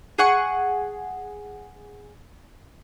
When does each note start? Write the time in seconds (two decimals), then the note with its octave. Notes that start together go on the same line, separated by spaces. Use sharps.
0.18 G#4 F#5 C#6